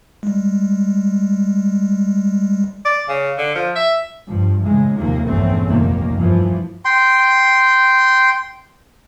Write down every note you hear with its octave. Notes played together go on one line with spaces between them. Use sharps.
G3 G#3
D5
C#3
D3
F3
E5
G2 F3
A2 C#3 E3 G#3
D#2 C3 D#3 F3 A#3
A#1 E2 G2 A3 C4 C#4
F1 D#2 G#2 D#3 A#3
G2 E3 F3
G5 C6